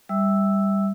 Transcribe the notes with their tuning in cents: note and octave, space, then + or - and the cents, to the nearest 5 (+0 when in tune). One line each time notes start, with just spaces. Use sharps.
G3 +15 E5 -5 E6 +0